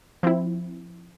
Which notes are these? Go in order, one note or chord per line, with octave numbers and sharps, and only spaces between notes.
F3 C4 E4